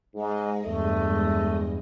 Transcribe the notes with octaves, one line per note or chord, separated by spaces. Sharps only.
G#2 G#3 D#5
E2 G2 A3